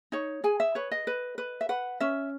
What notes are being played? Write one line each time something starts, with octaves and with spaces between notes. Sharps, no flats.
D#4 C#5
G#4 G#5
E5
B4 C#5
D#5
B4
B4
E5
B4 F#5
C#4 E5